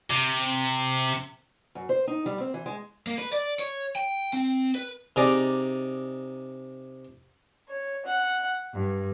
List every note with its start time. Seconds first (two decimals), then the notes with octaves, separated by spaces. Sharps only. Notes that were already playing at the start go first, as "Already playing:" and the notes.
0.10 C3
1.75 F#2
1.89 C5
2.07 D#4
2.26 G3
2.40 C4
2.54 E3
2.66 G#3
3.07 A#3
3.18 B4
3.33 D5
3.59 C#5
3.96 G5
4.33 C4
4.75 B4
5.16 C3 D#4 G#4 D5 A#5 D6
7.68 C#5
8.05 F#5
8.73 G2